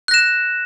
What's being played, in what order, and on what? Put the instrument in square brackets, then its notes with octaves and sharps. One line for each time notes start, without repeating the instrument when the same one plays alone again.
[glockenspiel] F#6
A#6
E7